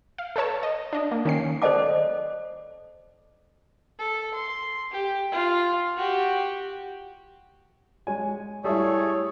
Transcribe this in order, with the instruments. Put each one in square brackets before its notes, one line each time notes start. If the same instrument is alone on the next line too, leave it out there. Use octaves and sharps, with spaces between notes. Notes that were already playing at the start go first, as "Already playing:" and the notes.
[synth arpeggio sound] F5
A4 B4 C#5 A5
D#5
D4 D#5
A#3
D#3 C#4 C7
[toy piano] A4 C5 D5 D#5 A5 D6
[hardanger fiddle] A4
C6
G4
F4
F#4 G4
[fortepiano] G#3 C#5 G#5
[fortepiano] G3 E4 [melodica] A3 G#4 A4 [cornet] C#5